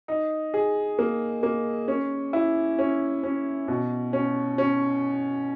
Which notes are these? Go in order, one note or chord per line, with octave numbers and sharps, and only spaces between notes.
D#4
G#4
A#3
A#3
C#4
E4
C#4
C#4
B2
C#4
C#4